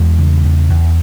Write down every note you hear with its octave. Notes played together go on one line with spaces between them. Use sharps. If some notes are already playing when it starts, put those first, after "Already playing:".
Already playing: E2 G#3
C#3
E2
E2